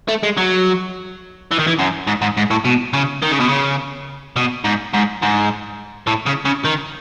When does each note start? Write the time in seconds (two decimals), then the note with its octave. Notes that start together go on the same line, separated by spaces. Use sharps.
0.08 A3
0.23 G#3
0.37 F#3
1.52 E3
1.59 D#3
1.68 E3
1.79 F#2
2.07 G#2
2.22 G#2
2.37 G#2
2.50 A2
2.65 B2
2.93 C#3
3.22 D#3
3.32 C#3
3.40 B2
3.49 C#3
4.36 B2
4.64 G#2
4.93 G#2
5.22 G#2
6.07 A2
6.27 C#3
6.45 C#3
6.65 D#3